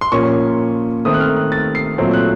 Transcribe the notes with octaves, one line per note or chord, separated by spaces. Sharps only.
C6
A#2 F3 A#3 C#4 C#6
D#3 A3 C4 D#6
F#6
F6
F#6
A6
C7
A#2 F#3 A3 C4
F#6